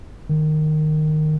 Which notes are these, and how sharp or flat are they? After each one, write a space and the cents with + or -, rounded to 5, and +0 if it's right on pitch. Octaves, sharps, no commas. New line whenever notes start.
D#3 -15